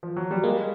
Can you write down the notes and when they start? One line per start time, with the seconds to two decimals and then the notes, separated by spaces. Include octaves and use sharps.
0.03 F3
0.16 F#3
0.31 G3
0.43 G#3 A#3